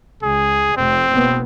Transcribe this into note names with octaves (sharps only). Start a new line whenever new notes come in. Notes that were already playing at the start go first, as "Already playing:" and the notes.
C#2 G#4
F1 C4
F#1 B2 B3